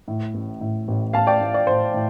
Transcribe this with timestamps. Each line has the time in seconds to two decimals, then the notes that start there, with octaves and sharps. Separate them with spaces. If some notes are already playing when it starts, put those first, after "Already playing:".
0.08 A2
0.34 A1
0.61 A2
0.88 A1
1.13 A1 F5 A5
1.27 D5 G5
1.41 A2
1.54 D5
1.67 A2 C5
1.94 A2